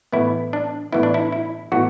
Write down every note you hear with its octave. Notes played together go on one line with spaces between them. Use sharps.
A2 E3 B3 E4
D4
A2 E3 B3 E4
D4
E4
E4
A2 E3 B3 F#4